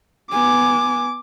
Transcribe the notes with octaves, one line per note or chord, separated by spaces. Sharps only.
B3 G#5 D6